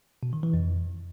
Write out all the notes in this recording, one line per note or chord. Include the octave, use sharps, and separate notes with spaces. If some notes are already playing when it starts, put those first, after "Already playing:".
B2
D#3
E3
F2